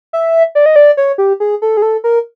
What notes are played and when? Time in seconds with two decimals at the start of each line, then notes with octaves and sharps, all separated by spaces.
0.13 E5
0.55 D5
0.66 D#5
0.76 D5
0.97 C#5
1.18 G4
1.40 G#4
1.62 A4
1.77 G#4
1.82 A4
2.04 A#4